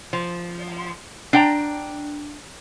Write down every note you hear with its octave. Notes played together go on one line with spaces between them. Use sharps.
F3
D4 G5 A#5